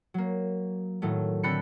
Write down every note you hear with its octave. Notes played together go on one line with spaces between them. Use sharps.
F#3 A#3
A2 D#3 F#3 A3
D3 C4 A4 B5 F#6 C#7